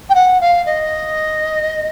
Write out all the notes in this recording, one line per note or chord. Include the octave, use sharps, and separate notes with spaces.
G5
F#5
F5
D#5